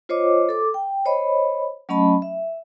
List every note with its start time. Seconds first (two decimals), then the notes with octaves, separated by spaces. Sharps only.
0.09 F4 C5 C#5 D#5 D6
0.49 A4 D6
0.74 G5
1.05 C5 C#5 D#5 B5
1.89 F#3 A3 C#4 D#5 A5 B5
2.22 E5